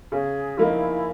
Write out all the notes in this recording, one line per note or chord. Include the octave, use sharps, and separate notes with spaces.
C#3 G#4
F3 A#3 D#4 E4